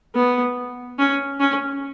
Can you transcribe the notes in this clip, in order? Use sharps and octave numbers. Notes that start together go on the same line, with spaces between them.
B3
C#4
C#4